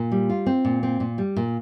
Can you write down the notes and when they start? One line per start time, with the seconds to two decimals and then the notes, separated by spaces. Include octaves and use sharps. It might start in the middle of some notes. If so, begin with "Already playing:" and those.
Already playing: A#2
0.11 G3
0.29 F4
0.46 C4
0.65 A#2
0.83 C4
1.00 A#2
1.18 G3
1.36 A#2